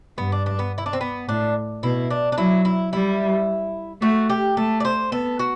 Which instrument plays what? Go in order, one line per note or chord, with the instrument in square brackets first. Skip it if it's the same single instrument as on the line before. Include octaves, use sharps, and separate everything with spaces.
[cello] G2 [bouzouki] B3
[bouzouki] D4
D4
B3
E4
D4
C4
B3
[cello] A2 [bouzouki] D4
[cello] B2 [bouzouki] E4
[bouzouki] D4
D4
[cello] F#3 [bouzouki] E4
[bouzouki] E4
[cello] G3 [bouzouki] E4
[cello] A3 [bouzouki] F#4
[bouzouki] G4
[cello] A3 [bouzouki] A4
[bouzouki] D5
C5
[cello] B3 [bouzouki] A4
[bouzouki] F#4